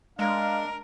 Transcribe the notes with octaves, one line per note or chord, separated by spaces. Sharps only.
G#3 D4 A#4 F5